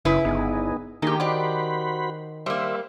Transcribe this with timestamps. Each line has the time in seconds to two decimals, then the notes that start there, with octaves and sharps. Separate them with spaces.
0.05 F#1 C#3 E4 B4
0.25 G1 B3 D#4 G#4
1.02 D#3 A#3 D#4 G4 G#4
1.20 F#4 G4 C5 D5 B5
2.46 G3 A#3 C5 E5